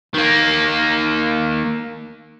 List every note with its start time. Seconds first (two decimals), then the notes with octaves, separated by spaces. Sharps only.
0.14 D#3 A#3